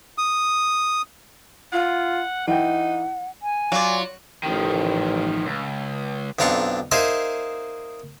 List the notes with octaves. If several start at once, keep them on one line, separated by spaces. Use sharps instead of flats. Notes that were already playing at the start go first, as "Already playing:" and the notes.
D#6
F4 F#5
E3 D#4 F#5 G5
G#5
F#3 F4 D5
A1 D#3 F3
C#2
B1 F2 D4 A#5 C6 C#6
A#3 D#4 G#4 C5 D#5 E5